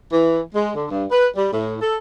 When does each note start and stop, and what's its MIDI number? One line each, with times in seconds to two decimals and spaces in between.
0.12 0.40 52
0.55 0.70 56
0.75 0.84 50
0.89 1.04 43
1.11 1.27 71
1.36 1.47 55
1.52 1.75 45
1.80 1.96 69